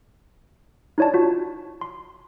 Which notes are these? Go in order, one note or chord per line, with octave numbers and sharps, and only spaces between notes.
D#4 E4 C#5 D5 A5
F4 F#4
C6